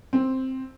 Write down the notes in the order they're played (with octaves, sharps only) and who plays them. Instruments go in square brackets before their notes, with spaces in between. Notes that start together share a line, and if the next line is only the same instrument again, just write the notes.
[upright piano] C4